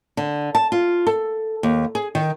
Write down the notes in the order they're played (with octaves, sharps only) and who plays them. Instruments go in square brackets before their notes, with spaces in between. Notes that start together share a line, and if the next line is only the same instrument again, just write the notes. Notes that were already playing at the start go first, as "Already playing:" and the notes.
[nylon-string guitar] D3
A5
F4
A4
D#2
G#4
D#3